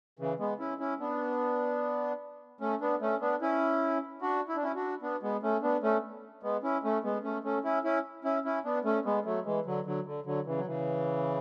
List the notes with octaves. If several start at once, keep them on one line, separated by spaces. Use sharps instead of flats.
C#3 E3
G#3 B3
C#4 E4
C#4 E4
B3 D4
A3 C#4
B3 D4
A3 C#4
B3 D4
C#4 E4
D4 F#4
E4
D4
C#4 E4
D4 F#4
B3 D4
G#3 B3
A3 C#4
B3 D4
A3 C#4
G#3 B3
C#4 E4
A3 C#4
G#3 B3
A3 C#4
A3 C#4
C#4 E4
C#4 E4
C#4 E4
C#4 E4
B3 D4
A3 C#4
G#3 B3
F#3 A3
E3 G#3
D3 F#3
D3 F#3
D3
D3 F#3
C#3 E3
F#3
C#3 E3